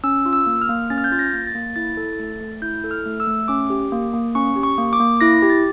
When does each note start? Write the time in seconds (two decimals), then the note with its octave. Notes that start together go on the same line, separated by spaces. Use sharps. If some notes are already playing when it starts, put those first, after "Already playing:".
0.04 C#4 E6
0.26 F4
0.33 E6
0.46 A#3
0.61 F6
0.69 A#3
0.90 C#4 A6
0.98 F6
1.04 G6
1.12 F4 A6
1.19 A#6
1.33 A#3
1.47 A6
1.55 A#3
1.76 E4 A6
1.97 A4
2.19 A3
2.41 A3
2.62 E4 G6
2.84 A4
2.91 F6
3.06 A3
3.20 E6
3.27 A3
3.48 C#4 D6
3.70 G4
3.92 A#3
4.13 A#3
4.35 C#4 C#6
4.56 G4
4.63 C#6
4.78 A#3
4.93 D6
5.00 A#3
5.21 E4 A#6
5.42 G4
5.50 A6